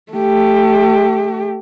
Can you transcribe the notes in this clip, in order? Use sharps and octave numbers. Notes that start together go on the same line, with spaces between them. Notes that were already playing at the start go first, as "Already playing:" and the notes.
A3 G4